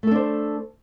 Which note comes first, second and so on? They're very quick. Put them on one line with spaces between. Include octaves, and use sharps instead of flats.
A3 A4 D4 C5